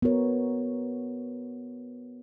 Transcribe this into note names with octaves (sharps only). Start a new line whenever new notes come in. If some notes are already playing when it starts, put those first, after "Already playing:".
B3 F#4 A#4 C#5